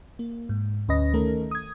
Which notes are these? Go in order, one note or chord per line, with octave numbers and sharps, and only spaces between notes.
A#3
G#2
D2 C#4 B4 D#5 A#6
D#3 A3 C#4 A4 A#4
D#6 G#6